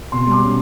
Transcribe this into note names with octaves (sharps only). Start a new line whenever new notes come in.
B2 C6
G3
D6
C#4